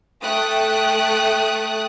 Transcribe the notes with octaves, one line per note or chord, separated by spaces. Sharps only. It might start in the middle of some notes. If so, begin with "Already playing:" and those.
A3 G5 D#6 F#6